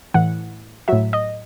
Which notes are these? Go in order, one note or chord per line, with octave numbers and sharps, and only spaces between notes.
A2 E3 F#5
A2 F#3 E5
D#5